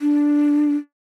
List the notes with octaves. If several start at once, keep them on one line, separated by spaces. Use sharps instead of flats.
D4